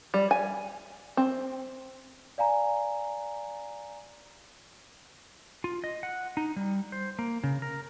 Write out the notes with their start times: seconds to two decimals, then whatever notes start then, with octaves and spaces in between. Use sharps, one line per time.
0.14 G3
0.31 G#5
1.17 C4
2.38 D5 F5 G#5 A#5
5.64 F4
5.84 D#5
6.03 F#5
6.37 D#4
6.56 G3
6.92 C5
7.19 A#3
7.44 C#3
7.62 A#4